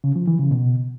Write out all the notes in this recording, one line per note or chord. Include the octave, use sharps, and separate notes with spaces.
C#3
F3
E3
C#3
B2